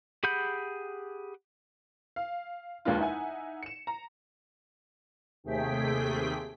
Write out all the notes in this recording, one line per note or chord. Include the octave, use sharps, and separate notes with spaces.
G4 G#4 F#5 B5 G6
F5
F1 D#2 G#3 A#3 D4 F4
D#4 E4 E5 F#5 G#5
C#7 E7
A#5
D#2 C3 A3 G#4 G5 B6